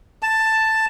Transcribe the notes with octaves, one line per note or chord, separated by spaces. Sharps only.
A5